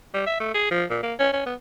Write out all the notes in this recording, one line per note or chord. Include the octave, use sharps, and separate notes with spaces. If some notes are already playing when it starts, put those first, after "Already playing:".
G3
E5
A3
G#4
F3
A#2
A#3
C#4
C#4
B3